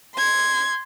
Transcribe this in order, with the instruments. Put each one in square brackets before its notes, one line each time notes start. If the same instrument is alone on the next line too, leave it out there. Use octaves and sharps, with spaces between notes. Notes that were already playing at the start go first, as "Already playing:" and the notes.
[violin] C6 G#6